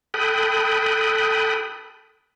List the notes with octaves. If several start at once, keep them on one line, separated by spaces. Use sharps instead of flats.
A4 G5 B5 D#6 F#6